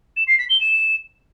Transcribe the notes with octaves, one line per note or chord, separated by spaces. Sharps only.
E7
C7
B6
G7
E7